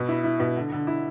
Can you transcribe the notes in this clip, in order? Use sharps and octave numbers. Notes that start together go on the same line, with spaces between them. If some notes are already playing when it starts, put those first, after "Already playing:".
Already playing: B2
E4
E4
B2
D3
D3
E4